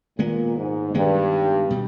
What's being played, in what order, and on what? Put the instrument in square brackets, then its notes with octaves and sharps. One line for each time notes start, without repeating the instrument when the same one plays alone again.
[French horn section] A#2 [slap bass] D#3 G#3 B3
[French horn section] G#2
[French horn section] G2 [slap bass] D#3 G#3 B3
[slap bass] B2 G3